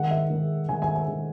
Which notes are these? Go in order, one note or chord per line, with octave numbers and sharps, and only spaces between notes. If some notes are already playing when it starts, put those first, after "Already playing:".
Already playing: D#3 G#3 F#5
E5
D#3 G#3
D#3 G#3 G#5
G#5
G#5
D#3 G#3